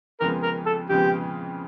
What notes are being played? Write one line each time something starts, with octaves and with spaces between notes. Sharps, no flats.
F2 C#3 F3 G#3 B3 A#4
A#4
A4
F2 C#3 F3 G#3 B3 G4